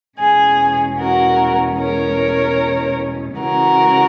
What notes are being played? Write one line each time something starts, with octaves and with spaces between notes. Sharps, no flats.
E2 B2 G#3 C#4 G#4
F#4 A#4
A#4 C#5
C#3 E3 G#3 C#4 F#4 A#4